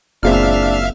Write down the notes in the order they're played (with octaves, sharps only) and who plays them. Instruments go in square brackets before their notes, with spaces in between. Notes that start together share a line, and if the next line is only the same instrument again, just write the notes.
[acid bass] F#1 [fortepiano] A#2 G#3 C4 [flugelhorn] D4 [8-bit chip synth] E5 F5 F6